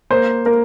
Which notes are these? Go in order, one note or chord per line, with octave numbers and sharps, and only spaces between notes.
A#3 C5
A#3 A#4